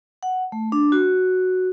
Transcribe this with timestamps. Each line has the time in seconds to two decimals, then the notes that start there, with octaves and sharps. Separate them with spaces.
0.23 F#5
0.52 A3
0.72 D4
0.92 F#4